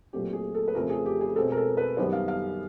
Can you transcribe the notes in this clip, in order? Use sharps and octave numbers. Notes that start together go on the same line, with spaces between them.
A#2 F#3 A3 C4 G4
G#4
A4
B4
F2 C#3 F3 A3 C4 A#4
G#4
G4
G#4
B2 G#3 C4 A4
A#4
A4
B4
F#2 D#3 G3 B3 C5
F5
F5